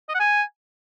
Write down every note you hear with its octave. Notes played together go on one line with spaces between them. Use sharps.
D#5
F#5
G#5